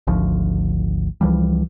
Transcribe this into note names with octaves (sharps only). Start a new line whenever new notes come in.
G#1 D2 F3
C#2 E3 F3 G3